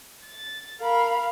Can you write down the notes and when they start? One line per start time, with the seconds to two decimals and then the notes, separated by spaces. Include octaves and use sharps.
0.24 A6
0.80 A#4 F5 B5